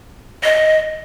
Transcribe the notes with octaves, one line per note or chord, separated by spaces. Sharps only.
D#5